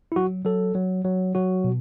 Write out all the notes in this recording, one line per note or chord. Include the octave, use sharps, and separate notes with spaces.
E4
F#3 F#4
F#3 A4
F#3
F#3
F#3 F#4
B2